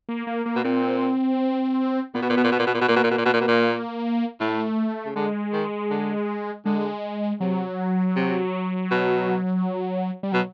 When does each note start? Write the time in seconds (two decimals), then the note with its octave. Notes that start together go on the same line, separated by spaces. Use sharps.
0.09 A#3
0.27 A#3
0.46 A#3
0.56 B2
0.64 A#2 C4
2.15 A#2 B3
2.22 B2
2.29 A#2
2.37 B2
2.44 A#2
2.52 B2
2.59 A#2
2.66 B2
2.74 A#2
2.81 B2
2.88 A#2 A#3
2.96 B2
3.04 A#2
3.11 B2
3.18 A#2
3.25 B2
3.33 A#2
3.40 B2
3.48 A#2
4.40 A2 A3
5.06 C#3
5.16 D3 G#3
5.53 D#3
5.90 D3
6.65 D3 G#3
7.40 C3 F#3
8.16 C3
8.91 B2
10.23 G3
10.32 B2 F#3